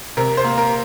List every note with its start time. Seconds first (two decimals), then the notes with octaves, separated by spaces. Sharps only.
0.17 C3 A#4
0.37 C5
0.44 A#3
0.57 A#4